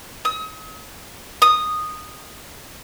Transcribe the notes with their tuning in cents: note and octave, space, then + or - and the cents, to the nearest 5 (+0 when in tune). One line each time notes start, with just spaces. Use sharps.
D#6 +40
D#6 -10